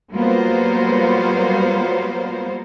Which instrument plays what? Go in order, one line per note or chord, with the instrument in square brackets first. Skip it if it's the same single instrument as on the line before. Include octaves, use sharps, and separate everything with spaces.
[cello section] F#3 G3 A#3 B3 F4 C5